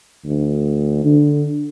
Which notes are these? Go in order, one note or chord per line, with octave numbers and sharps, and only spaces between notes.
D2
D3